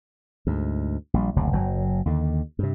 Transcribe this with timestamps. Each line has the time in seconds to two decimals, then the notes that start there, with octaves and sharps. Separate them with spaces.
0.47 D2 G#2
1.14 A#1 G3
1.36 F#1 D2 C3
1.52 F#1 F#3
2.06 D#2 D3
2.59 G2 C3